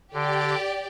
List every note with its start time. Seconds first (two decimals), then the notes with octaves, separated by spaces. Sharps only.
0.13 D3 G4 D5 G5